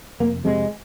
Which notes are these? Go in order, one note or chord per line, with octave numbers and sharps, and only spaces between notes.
F1 A#3
F2 C3 G#3